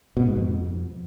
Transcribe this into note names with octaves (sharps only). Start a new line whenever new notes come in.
B2
G#2
F2